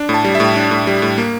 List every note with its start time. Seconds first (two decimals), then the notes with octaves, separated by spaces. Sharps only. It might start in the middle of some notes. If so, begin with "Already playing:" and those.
Already playing: D4
0.09 A2
0.14 A5
0.24 G3
0.35 E5
0.40 A2
0.56 D4
0.71 A2
0.87 G3
1.02 A2
1.18 A#3